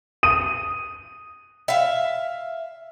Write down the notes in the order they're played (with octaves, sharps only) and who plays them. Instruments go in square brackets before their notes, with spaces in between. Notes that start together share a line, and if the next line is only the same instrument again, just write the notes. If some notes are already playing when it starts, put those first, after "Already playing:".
[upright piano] D#6 D#7
[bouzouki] E5 F5